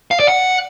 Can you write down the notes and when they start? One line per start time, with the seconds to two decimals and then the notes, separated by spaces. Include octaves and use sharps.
0.11 F5
0.20 D5
0.28 F#5